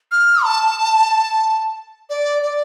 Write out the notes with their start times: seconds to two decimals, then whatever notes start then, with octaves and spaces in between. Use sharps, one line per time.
0.11 F6
0.44 A5
2.09 D5
2.42 D5